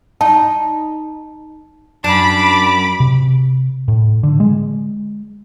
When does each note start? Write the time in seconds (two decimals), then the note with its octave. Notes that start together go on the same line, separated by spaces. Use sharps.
0.21 D#4 A5
2.04 F#2 D4 B5 D6
3.00 C3
3.88 A2
4.23 D3
4.40 G#3